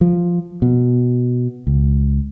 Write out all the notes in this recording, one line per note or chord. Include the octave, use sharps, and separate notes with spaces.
F3
B2
C#2